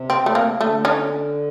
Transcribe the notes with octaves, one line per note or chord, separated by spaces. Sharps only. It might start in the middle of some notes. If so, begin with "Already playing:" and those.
Already playing: C3
C4
A3
A#3
D3 A3
C#4 D#4